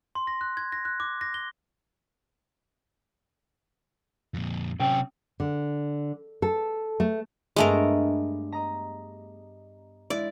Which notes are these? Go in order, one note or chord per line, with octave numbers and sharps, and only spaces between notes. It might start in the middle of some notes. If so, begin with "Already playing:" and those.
C6
A#6
F#6
G#6
A#6
F#6
D6
A#6
G7
F2 A#2
F#2 C3 C#4 F#4 G5
D3
A4
A3
G2 G#3 A3 B3 D4 A#4
D#5 A#5
G#3 E4 D5